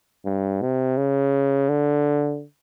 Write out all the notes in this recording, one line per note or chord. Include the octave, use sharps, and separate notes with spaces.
G2
C3
C#3
D3